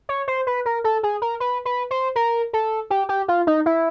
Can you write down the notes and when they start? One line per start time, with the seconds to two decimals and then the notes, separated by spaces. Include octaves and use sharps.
0.09 C#5
0.28 C5
0.47 B4
0.66 A#4
0.84 A4
1.03 G#4
1.22 A#4
1.40 B4
1.65 B4
1.91 C5
2.16 A#4
2.53 A4
2.90 G4
3.09 G4
3.28 F4
3.47 D#4
3.66 E4